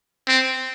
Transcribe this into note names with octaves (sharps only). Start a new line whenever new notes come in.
C4